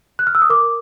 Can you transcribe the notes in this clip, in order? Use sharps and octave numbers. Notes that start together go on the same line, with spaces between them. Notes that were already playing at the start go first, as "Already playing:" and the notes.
F#6
F6
E6
D#6
A#4 D6